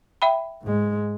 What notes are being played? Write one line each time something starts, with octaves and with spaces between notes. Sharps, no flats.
E5 G5 B5
G#2 G#3